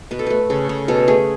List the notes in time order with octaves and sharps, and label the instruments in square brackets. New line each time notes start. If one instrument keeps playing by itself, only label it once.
[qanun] B2 B4
A4
A3 B4
C#3 A4
C#3
B2 A4
A3 G#4